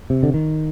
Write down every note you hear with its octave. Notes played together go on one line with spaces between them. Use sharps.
C3
D3
D#3